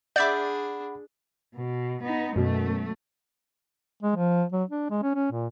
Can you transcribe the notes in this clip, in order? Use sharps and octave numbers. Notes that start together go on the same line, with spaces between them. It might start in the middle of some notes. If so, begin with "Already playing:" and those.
D4 G#4 D5 E5 F#5 B5 D6 G6
B2
B3 D#4
F#2 B2 F#3 A3
G#3
F3
F#3
D4
G#3
C#4
C#4
A#2